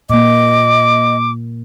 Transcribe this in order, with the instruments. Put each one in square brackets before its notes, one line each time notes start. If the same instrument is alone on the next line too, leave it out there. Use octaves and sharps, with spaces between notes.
[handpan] A#2 A#3 [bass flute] D#5 [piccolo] D6